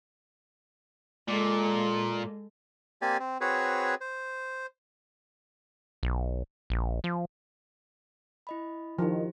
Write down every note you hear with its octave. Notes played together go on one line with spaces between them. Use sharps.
A#2 G#3 A4
A#3 C4 G4 D5 G#5
C4
C4 F#4 G#4 B4 C#5
C5
B1
A#1
F3
E4 D#5 B5
D#3 F3 E4 G4